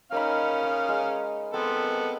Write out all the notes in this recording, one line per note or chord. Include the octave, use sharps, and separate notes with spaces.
A#3 C#4 D#4 F5 B5
D#6
G#3
B3 C4 A4 G#5